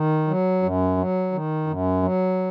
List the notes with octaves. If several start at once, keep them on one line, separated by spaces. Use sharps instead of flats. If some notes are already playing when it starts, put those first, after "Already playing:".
Already playing: D#3
F#3
F#2
F#3
D#3
F#2
F#3